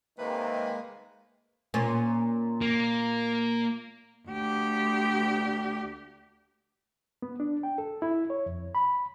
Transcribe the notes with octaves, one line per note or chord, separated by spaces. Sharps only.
C3 D#3 G#3 A#3 B4
A#2 C#4
A#3
D2 G4
B3
D4
G5
A4
E4
C#5
F2
B5